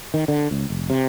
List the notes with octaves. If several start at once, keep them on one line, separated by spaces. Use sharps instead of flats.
D#3
D3
C#2
F1
C3